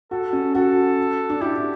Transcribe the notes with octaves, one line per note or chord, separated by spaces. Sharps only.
F#4 A4
C#4
F#4 A4
D4
E4 G4
E4